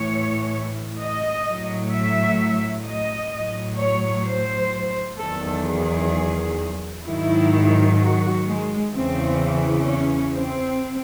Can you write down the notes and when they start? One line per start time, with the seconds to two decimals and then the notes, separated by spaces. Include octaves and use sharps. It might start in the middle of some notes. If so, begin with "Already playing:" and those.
Already playing: A2 E3 C#5
0.98 D#5
1.45 A2 F#3
1.92 E5
2.85 D#5
3.33 A2 F#3
3.79 C#5
4.26 C5
5.19 E2 D#3 F#3 A4
5.65 G#4
7.05 G#2 D#3 F#3 E4
7.98 F#4
8.45 G#3
8.92 E2 C#3 E3 C4
9.86 C#4
10.33 C4